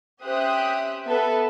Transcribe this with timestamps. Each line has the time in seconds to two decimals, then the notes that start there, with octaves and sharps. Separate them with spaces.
0.23 C#4 G4 C5 E5 D#6 F#6
1.06 B3 A4 B4 E5